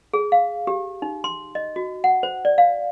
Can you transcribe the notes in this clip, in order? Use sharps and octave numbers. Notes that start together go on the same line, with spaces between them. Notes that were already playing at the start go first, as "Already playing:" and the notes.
G#4
F5
G4
D#4
C6
D#5
F#4
F#5
C5
D5
F5